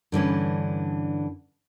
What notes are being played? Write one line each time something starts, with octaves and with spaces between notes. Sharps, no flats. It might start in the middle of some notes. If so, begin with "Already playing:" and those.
G2 D3 E3 C#4